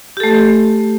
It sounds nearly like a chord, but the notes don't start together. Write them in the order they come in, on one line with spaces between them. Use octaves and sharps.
G4 A4 A3